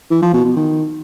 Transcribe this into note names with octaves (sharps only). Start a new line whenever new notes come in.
E3
F3
B2
B2
D#3